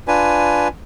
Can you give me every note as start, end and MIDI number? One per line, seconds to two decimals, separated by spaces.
0.08 0.68 62
0.08 0.68 65
0.08 0.68 71
0.08 0.68 80